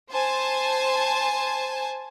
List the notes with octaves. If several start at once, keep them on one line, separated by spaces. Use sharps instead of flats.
C5 G#5 A5